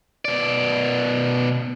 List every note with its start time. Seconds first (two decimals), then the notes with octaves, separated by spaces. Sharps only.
0.25 B2 D5